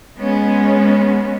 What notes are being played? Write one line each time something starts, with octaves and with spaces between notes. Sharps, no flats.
G#3 B3 C#4